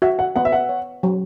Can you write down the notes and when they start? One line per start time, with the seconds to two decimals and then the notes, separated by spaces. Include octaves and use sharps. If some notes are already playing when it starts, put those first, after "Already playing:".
0.02 F#4 E5
0.19 F#5
0.36 B3 F#5
0.45 E5
0.52 F#5
0.69 C#5
1.03 F#3